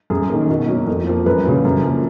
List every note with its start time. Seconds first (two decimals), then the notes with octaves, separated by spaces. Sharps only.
0.10 F#2 G#4
0.30 D#3 A#3
0.50 B2
0.68 F#3 A#3
0.87 F2
1.07 F3 A#3
1.26 F#2 B4
1.45 C#3 F#3 A#3
1.65 F#2
1.84 F3 A#3